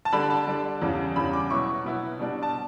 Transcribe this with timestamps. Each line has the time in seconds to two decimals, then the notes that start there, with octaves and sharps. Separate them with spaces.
0.05 A5
0.13 D3 G3 D4 B5
0.30 A5
0.47 D3 G3 D4
0.82 E2 C#3 G3
1.16 E2 C#3 G3 B5
1.33 D6
1.50 B2 F#3 B3 E4 C#6
1.85 B2 F#3 B3 E4
2.19 B2 G3 D4
2.43 A5